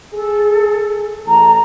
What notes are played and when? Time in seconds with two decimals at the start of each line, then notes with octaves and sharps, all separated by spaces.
0.14 G#4 A4
1.27 A1 A5 A#5